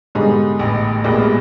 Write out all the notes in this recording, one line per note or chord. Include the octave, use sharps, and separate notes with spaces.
G#2 D3 G3 B3 D#4 G#4
A1 A2
A#1 A#2 G#3 B3 E4 G4 A#4